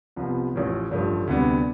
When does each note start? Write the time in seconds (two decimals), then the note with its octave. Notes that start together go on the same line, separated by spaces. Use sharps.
0.16 C2 C3 F3 B3
0.53 A1 A2 F3
0.91 A1 G2 F3 A3
1.27 D2 C3 G3 B3 D4